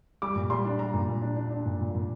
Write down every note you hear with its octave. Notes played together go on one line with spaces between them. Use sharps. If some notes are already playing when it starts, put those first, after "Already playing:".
G3 D6
A#2
G3 C6
D4
G3 A#5
A#2
A#2
D4
D4
D4
A#2
A#2
A#2